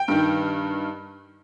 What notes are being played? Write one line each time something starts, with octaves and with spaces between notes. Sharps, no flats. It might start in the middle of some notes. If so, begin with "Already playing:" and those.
Already playing: G5
G2 D#3